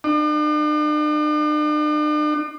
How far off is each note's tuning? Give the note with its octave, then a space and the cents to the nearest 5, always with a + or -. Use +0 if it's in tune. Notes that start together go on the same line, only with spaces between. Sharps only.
D4 +45